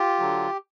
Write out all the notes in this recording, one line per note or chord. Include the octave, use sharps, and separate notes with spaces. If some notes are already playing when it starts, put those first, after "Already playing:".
Already playing: F4 G4
D3 F#3